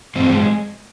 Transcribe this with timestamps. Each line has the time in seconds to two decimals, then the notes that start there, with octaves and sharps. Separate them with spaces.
0.16 G2 F3 C4
0.31 G#3